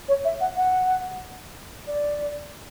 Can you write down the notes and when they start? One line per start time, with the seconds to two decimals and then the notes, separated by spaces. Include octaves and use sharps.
0.08 C#5
0.25 E5
0.41 F#5
0.57 F#5
1.87 D5